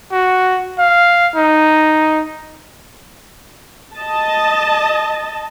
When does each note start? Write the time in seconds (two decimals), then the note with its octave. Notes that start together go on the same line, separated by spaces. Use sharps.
0.12 F#4
0.79 F5
1.36 D#4
3.96 D#5 A5